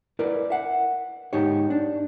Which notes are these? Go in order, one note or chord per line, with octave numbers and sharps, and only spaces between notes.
E4 A#4 B4 D5
E5 F#5
G#2 D#4 G4 C#5
D4